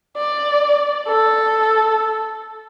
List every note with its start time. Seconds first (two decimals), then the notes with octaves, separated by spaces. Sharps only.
0.17 D5
1.08 A4